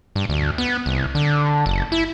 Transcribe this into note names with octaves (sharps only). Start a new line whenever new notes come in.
G2
D2
B3
C2
D3
F#1
E4